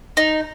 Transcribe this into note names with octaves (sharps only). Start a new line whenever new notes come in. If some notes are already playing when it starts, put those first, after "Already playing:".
D#4